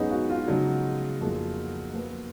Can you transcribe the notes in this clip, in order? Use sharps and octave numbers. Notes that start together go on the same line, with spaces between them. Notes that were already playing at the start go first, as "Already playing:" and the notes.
Already playing: G#2 F#3 B3 C#4 D#4 G#4 B4
F#4
F4
C#3 F3 F#3 G#3 D#4
F2 F3 A#3 F4 G#4
F3 A#3 F4 B4